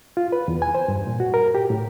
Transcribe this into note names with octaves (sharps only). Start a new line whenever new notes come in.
F4
B4
E2
G#5
C5
G2
A#2
F#4
A#4
G4
A2